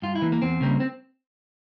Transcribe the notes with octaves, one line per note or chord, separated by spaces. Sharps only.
G2 F4
E4
E3 A#3
A#3
E2 C4
C#3 G3 A#3
C4